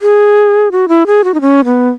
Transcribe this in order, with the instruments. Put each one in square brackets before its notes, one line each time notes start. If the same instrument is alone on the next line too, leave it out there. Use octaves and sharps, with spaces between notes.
[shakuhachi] G#4
F#4
E4
G#4
F#4
D#4
C#4
B3